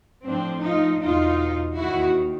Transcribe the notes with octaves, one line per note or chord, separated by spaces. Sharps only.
A2 F3 C4 D4
D#4 F4
E2 B2 D#4 F4
D#2 D#3 E4 F#4